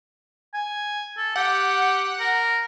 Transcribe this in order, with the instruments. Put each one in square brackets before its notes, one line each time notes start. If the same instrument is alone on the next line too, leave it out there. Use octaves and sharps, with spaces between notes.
[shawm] G#5
A4
[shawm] G4 [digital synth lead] F#5
[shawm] A#4